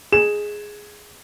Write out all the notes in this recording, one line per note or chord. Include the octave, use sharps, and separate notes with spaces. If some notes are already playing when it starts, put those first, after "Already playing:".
G#4 E7